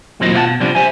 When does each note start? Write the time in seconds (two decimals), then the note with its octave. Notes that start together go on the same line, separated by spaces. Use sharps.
0.20 D#2 A#2 F#3 C4 E4 D#5
0.33 B2 F4 C5 D5 F#5 A5
0.46 B2
0.60 C3 F3 G3 B3 C4 D4
0.75 G4 C5 E5 G#5